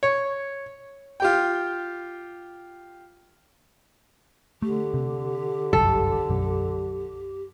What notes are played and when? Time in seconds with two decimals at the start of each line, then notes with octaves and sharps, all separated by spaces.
0.03 C#5
1.20 F4 G4 G5
4.62 D3 A3 G4
4.94 C3
5.73 G1 C2 F#2 A4
6.30 B1 F#2